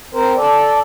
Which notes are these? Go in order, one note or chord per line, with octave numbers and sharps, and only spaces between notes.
C4 A#4 C5
A4 D5